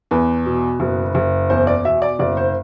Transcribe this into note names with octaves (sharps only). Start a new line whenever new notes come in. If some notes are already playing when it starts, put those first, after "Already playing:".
E2 B4
B2
F#1
F#1
E2 C5
D5
B2 E5
D5
F#1 D5
C5